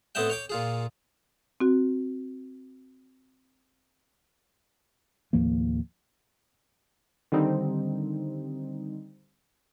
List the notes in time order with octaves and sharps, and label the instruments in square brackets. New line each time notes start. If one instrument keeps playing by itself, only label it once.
[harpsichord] A2 B3 C4 D#5 E5 G5
C#5 G5 D6
A#2 F4 G#4
[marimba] C4 F#4
[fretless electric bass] D#2 A2 F3 A#3
[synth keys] D3 D#3 G3 C4 D#4